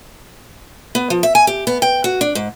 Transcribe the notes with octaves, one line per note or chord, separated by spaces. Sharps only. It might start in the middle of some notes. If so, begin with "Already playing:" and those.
B3
F3
E5
G#5
G4
B3
G5
F#4
D4
G#2